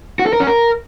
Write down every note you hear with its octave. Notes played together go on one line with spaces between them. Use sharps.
F#4
A4
A#4
C#4
A#4